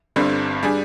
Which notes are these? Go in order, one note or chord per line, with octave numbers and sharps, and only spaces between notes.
G1 G2 D3 G3 C4
G3 D4 G#4